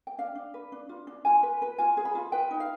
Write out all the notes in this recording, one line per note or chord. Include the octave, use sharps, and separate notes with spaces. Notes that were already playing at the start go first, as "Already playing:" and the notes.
G5
D4 F5
D4
B4
D4
F4
D4
F4 G#5
B4
B4
F4 G#5
G#4
B5
F4
B4 G5
D#4
F5